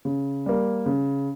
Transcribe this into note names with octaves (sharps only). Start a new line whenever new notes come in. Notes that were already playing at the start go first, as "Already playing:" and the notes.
C#3
G3 A#3
C#3